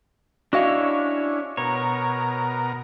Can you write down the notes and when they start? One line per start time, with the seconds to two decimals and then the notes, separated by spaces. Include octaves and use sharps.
0.53 C#4 D4 E4 F#4 C#5 D#5 F5
1.57 B2 A#4 C#5